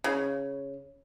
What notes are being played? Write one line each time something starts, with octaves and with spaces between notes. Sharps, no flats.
C#3